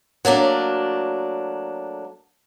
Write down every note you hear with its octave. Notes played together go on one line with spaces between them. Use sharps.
F#3 A3 A#3 D4